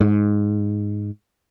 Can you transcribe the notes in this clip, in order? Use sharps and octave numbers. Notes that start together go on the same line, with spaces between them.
G#2